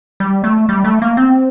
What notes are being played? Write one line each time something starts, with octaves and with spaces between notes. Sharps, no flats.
G3
A3
G3
A3
A#3
C4